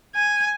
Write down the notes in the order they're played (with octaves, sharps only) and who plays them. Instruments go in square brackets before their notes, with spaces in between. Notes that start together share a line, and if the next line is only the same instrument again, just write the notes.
[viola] G#5